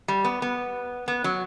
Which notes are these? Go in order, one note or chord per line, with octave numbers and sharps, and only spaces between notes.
G3
B3
B3
B3
F#3